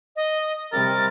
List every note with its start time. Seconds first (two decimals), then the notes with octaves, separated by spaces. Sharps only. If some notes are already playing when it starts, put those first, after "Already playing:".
0.16 D#5
0.72 C3 G3 A#4 A6